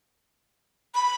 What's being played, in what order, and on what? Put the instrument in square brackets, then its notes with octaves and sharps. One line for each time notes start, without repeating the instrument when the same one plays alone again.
[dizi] B5